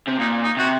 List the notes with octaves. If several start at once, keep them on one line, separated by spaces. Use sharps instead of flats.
C3
A#2 D#4
D#4
C3 F#4